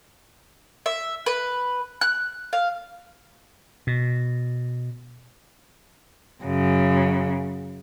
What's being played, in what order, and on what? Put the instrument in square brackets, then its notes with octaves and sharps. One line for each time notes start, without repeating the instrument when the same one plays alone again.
[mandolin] E5
B4
F#6
F5
[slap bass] B2
[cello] F#2 C#3